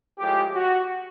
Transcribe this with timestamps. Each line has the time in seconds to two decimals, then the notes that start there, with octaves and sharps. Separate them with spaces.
0.18 A2 F3 G#3 G4
0.54 F#4